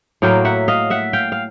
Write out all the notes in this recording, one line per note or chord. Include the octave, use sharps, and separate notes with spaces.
A2 F#3 A#3 F5 G5
E5 F#5
D#5 F5
E5 F#5
F5 G5
F5